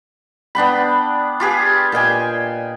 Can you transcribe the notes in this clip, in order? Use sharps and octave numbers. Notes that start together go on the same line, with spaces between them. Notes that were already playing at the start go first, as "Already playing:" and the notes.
B3 D4 G5 B5
F4 G4 G#4 B4
A#2 D#5 G5 G#5